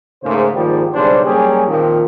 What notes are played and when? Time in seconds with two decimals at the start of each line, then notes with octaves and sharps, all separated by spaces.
0.23 G#2 C#3 A3 A#3 C5
0.55 G#2 D#3 F3 G3 A#3 G4
0.94 B1 C#3 G3 D4 C5
1.25 F#3 G3 A#3 C#4 G4 G#4
1.67 A#2 D#3 F3 A#3 C4